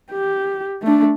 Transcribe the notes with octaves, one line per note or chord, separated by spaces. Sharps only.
G4
A3 D4